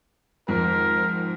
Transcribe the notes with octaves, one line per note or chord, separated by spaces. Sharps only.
F2 G#2 D#3 A#4